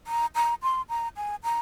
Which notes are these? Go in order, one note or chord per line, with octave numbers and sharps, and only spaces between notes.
A#5
A#5
C6
A#5
G#5
A#5